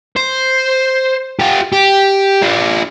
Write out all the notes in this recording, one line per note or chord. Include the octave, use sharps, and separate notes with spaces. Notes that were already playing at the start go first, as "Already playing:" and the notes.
C5
F4 G4
G4
D4 F4